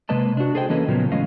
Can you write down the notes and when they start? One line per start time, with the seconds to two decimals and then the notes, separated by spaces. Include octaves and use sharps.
0.09 C3 G#3 A#3 B4 D#5 A5
0.37 D4 F#4
0.55 G#4 A4 C5 D#5 G5
0.69 E3 A#3 C#4 A4 B4 D#5
0.88 A#2 C#3 F3 F#3 B3
1.12 A2 E3 G#3 C#4 D#5 F5